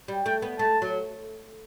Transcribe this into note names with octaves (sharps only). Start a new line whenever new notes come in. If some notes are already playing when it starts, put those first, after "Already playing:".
G3
A3 G5
B3
A3 A5
F#3